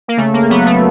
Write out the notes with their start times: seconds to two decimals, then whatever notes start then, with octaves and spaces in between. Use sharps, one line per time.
0.08 A#3
0.17 C#3 A3
0.34 A#3
0.50 F#3 B3
0.66 A3